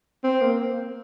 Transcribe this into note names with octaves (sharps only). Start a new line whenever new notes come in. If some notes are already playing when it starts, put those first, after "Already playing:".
C4
A#3